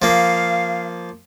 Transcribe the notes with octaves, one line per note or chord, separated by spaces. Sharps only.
F3 A#3 F5